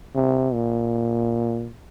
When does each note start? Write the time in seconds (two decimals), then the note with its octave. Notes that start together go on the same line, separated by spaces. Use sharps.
0.15 C3
0.54 A#2